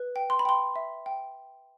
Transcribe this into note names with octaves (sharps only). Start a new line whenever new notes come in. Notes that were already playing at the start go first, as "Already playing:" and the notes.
Already playing: B4
G5
C6
B5
G5 C6
E5
G5